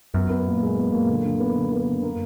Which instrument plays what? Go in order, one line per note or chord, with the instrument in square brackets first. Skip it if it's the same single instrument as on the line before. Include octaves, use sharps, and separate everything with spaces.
[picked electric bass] F#2 [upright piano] B3
[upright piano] B3
A#2
G#3
B3
A#2
D3
D3
B3
D3
B3
D3
A#3